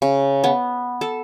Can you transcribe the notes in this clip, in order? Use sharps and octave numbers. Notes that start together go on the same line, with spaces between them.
C#3
B3
A4